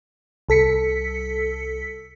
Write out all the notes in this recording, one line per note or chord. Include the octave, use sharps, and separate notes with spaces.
C2 A4 B6 C#7